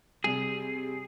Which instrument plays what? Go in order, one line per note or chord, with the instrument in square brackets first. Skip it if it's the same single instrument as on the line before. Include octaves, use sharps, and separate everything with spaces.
[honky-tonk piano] C3 G3 [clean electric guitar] G#4